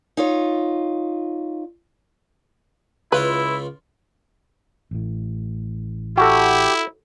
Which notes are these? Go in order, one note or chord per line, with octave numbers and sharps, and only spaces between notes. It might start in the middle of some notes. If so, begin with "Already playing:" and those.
D#4 F4 C#5
C#2 E4 F4 B4 F5
A1 A2
E4 F#4 G4 A4